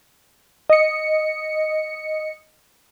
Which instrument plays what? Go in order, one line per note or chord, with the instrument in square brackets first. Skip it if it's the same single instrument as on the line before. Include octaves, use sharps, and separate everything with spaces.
[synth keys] D#5 C#7